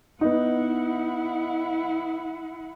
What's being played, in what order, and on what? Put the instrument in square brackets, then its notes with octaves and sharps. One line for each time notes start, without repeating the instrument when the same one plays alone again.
[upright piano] B3 D#4 [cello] E4 F#5